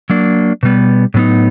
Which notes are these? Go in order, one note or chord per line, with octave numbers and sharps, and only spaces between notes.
F#3 A#3 D4
B2 G3 B3
A2 F#3 B3 D#4